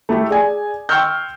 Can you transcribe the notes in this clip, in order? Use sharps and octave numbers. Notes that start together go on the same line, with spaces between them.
A3 E4 G4 A4
G#4 D5 G#5
G5 C6 C#6 E6 F6 G6